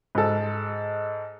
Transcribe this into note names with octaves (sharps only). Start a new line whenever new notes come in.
G#2 A4